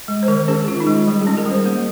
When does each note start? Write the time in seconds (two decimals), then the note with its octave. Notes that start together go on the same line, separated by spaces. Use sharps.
0.08 G#3
0.23 C5
0.28 D#3 A#4
0.48 C#4 G#4
0.68 D#3 F4
0.80 D#4
0.87 G#3 F4
1.07 G3
1.21 G#4
1.27 C#4
1.37 A#4
1.46 G3 C5
1.66 A#3